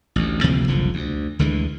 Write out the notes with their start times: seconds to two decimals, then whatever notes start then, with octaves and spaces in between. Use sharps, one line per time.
0.16 A1 D2
0.44 D2 C3 F3 A#3
0.68 F#1 C2 D3 F3
0.94 D2
1.39 D2 D3 E3 G#3